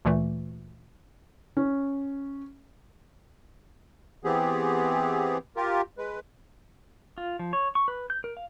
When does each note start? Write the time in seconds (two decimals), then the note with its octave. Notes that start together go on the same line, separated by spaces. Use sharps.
0.05 D2 A#2 E3 A3
1.57 C#4
4.24 E3 B3 C4 G4 G#4
5.56 F4 G4 A#4
5.98 G#3 B4
7.18 F4
7.39 F3
7.53 C#5
7.75 C#6
7.88 B4
8.10 G6
8.24 A#4
8.37 F5